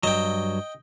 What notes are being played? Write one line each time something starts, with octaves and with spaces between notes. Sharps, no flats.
G2 F#3 D#5 G5